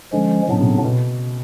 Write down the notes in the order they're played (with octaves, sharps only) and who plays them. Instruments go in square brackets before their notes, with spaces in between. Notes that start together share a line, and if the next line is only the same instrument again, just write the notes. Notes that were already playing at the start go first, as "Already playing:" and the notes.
[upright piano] D3 [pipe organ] F3 G#3 C#4
[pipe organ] A2 F#3 B3 D4 [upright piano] C#3
[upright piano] C3
C3
B2